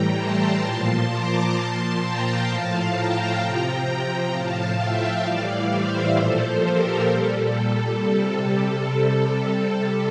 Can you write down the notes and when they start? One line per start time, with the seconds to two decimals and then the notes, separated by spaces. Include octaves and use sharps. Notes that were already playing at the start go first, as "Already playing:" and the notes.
Already playing: A2 E3 G3 G5 A#5
0.15 A5 C6
0.62 A#2 F3
1.08 A#5 D6
1.53 A#2 F3 A5 C6
1.99 G5 A#5
2.45 A2 F3 F5 A5
2.91 G5 A#5
3.38 C3 F3
4.30 A2 F3 F5 A5
4.76 E5 G5
5.22 A2 E3 G3 D5 F5
5.69 C5 E5
6.14 A#2 F3 A4 C5
6.61 G4 A#4
7.07 A#2 G3 A4
7.53 A4
7.98 C3 G3
8.91 C3 G3 A4